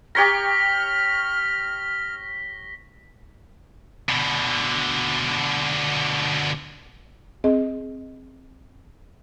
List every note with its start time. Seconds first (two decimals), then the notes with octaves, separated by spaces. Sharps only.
0.15 G4 C#5 A#5 F6 A#6 B6 G7
4.09 B2 D3
7.44 C4 G#4 D#5